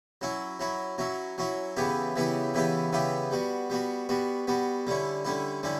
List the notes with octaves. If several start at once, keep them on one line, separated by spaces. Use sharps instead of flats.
F#3 C#4 E4
F#3 C#4 E4
F#3 C#4 E4
F#3 C#4 E4
C#3 E3 B3 E4 G4
C#3 E3 B3 E4 G4
C#3 E3 B3 E4 G4
C#3 E3 B3 E4 G4
G3 B3 F#4
G3 B3 F#4
G3 B3 F#4
G3 B3 F#4
D3 G3 C#4 E4
D3 G3 C#4 E4
D3 G3 C#4 E4